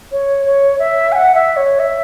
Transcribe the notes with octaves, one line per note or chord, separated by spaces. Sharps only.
C#5
C#5
E5
G#5
F#5
E5
C#5
E5